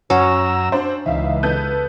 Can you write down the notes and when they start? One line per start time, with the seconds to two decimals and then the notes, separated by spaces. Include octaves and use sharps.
0.10 F#2 C#4 F#4 A#5 E6
0.72 D4 C5
1.06 C#2 E3 D#4 E5 F5
1.43 B3 A4 G6